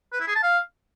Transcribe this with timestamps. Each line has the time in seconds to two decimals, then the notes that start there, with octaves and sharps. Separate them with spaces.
0.13 B4
0.20 E4
0.28 G#4
0.35 A5
0.43 F5